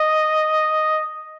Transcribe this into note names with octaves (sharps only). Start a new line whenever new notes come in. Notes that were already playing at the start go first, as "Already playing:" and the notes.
Already playing: D#5